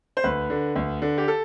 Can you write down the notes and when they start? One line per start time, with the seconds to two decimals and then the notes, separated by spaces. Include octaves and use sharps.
0.17 C5
0.24 D2 B4
0.50 D3
0.75 D2
1.02 D3
1.18 G4
1.28 A4